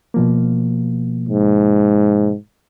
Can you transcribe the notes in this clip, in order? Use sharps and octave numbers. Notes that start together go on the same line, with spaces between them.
B2 F3 A#3
G#2